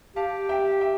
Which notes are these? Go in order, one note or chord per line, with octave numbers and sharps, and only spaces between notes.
G4 F5 A5
E5 G5
E5 G5